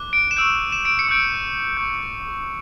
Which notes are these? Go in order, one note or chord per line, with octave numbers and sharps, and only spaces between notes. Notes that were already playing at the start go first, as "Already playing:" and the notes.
Already playing: D6 F#6
D7
E7
C#6 E6 G6 D7
E7
D7
C#7
C#6 E6 G6 D7
C#6 G6